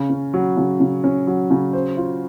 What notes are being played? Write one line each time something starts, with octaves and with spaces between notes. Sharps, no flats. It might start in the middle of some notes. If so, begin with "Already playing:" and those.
Already playing: C#3
C#4
F#3
C#3
C#3
C#4
F#3
C#3
C5
F4